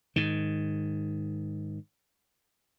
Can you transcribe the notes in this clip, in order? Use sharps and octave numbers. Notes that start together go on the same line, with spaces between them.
G#2 D#3